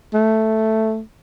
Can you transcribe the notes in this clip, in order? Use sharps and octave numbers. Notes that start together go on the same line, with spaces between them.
A3